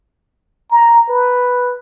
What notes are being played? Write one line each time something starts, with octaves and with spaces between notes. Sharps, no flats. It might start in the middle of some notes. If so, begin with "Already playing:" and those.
A#5
B4